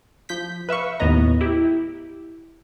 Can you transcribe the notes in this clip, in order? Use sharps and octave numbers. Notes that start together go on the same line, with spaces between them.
F3 G6 B6
B4 E5 F5 C#6
D#2 A2 B3 D#5 A#5
E4 G4